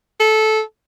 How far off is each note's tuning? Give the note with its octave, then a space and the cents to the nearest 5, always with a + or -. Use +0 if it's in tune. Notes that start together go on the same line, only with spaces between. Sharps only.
A4 -15